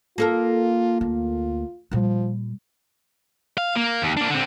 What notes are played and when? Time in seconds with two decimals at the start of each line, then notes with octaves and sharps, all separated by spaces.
0.18 A#3 F4 A4 A#4
1.01 D2 F4
1.91 A#2 F3 G3
3.58 F5
3.76 A#3
4.02 D#2
4.17 A#3 D4
4.30 D3 C4